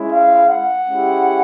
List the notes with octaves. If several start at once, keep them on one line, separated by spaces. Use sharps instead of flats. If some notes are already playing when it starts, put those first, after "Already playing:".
Already playing: G#3 C#4 E4
F5
F#5
G#3 C#4 E4 G4